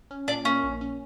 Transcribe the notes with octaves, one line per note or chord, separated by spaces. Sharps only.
C#4
A#2 D4
A#3 C#4
A#1
C#4